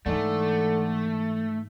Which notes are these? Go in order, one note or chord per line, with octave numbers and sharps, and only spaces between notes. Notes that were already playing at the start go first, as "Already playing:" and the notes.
G#2 D3 E3 A3